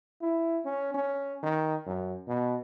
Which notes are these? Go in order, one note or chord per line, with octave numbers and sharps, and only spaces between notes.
E4
C#4
C#4
D#3
F#2
B2